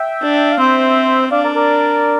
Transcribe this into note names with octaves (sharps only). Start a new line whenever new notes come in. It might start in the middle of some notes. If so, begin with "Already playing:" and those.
Already playing: E5 G5
D4
F5
C4 C5 E5
D4 D5 F5
A#4 D5
A#4 D5